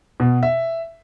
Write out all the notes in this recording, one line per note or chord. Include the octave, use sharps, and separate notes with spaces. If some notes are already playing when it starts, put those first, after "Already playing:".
B2
E5